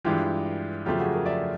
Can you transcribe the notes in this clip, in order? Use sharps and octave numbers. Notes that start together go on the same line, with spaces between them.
G2 E3 G#3 F4 G4
F2 C#3 F#3 A3 F4 G4
F#4 G#4
G#4 A#4
D5 E5